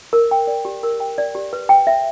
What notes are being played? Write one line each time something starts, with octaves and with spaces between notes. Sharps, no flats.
A#4
G5
D5
G4
A#4
G5
D5
G4
B4
G5
E5